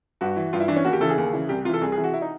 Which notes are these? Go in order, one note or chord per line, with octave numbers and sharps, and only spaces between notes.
G2 F#4
E3
G2 F4
E4
E3 D4
C#4
D#2 F#4
G4
C#3 E3 A4
G#4
D#2
C#3 E3
C2 G4
C3 E3 F4 A4
C2 G#4
G#4
C3 E3
F#4
E4
D#4